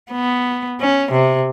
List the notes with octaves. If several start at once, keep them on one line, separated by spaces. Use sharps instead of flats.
B3
C#4
C3